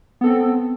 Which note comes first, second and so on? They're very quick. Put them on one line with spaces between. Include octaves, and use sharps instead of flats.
B3 A4 C4